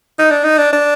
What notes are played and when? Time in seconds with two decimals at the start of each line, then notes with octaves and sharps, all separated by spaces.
0.19 D#4
0.31 D4
0.45 D#4
0.58 D4
0.73 D4